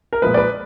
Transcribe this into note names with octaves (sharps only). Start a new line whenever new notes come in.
A#4
A#2 F3 G#3 B4
D5
B4